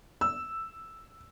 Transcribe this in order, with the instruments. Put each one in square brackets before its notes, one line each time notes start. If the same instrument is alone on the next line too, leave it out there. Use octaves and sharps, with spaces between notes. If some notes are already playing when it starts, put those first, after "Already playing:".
[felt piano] E6